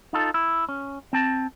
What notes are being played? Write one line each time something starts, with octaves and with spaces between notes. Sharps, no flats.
D#4 F4 A4
E4
C#4
C4 A5